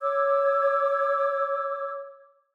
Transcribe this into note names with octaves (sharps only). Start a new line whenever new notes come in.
C#5 D6 E6 G#6